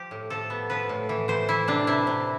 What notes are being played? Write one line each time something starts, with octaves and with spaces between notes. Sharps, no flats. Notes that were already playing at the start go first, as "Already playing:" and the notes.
Already playing: F3 G4
A2
F3 A4
B3
F3 B4
A2
E3
E3 C5
E3 E4
C3 D4
C3 E4
C3